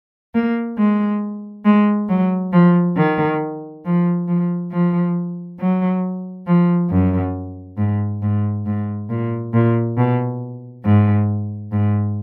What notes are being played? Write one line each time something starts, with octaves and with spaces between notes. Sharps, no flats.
A#3
G#3
G#3
F#3
F3
D#3
F3
F3
F3
F#3
F3
F#2
G#2
G#2
G#2
A#2
A#2
B2
G#2
G#2